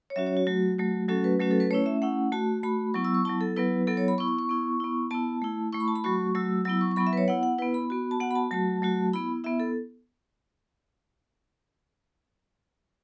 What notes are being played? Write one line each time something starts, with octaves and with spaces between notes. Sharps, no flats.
C#5
F#3 C#4 F#4 E5
C#5
F#4
F#3 A3 F#4
F#3 A3 F#4
F#3 A3 C#4 F#4 A4
B4
F#3 A3 C#4 F#4
A4
B4
A3 C#4 E4 C#5
E5
A3 C#4 E4 F#5
A3 F#4 A5
A3 F#4 B5
F#3 B3 E4 C#6
E6
C#6
F#3 B3 E4 A5
A4
F#3 B3 E4 B4
F#3 B3 E4 A4
C#5
B5
B3 E4 C#6
C#6
C#6
B3 E4
B3 E4
B3 E4 A5
A3 E4
A3 E4 C#6
B5
A5
B5
F#3 A3 F#4 C#6
F#3 A3 F#4 E6
F#3 B3 E4 E6
C#6
C#6
F#3 B3 E4 B5
E5
B4
C#5
B3 E4 F#5
F#5
B3 E4 B4
B5
B3 F#4
A5
B3 F#4 F#5
B5
A5
F#3 A3 F#4 A5
F#3 A3 F#4
B3 E4 B5
B3 E4 E5
A4